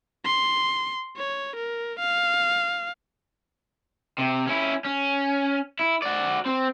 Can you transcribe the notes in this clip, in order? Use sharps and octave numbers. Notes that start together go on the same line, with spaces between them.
C6
C#5
A#4
F5
C3
C#4 E4
C#4
E4
F#4 D5
C4